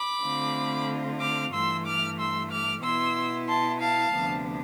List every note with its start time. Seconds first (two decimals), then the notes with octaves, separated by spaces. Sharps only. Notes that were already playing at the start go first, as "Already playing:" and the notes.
Already playing: B5 D6
0.23 D3 A3 C4 F4
1.20 D6 F6
1.53 G2 E3 A3 C6 E6
1.86 D6 F6
2.18 C6 E6
2.51 D6 F6
2.82 B2 B3 E4 C6 E6
3.47 A5 C6
3.80 F5 A5
4.13 D2 C3 F3 B3 D4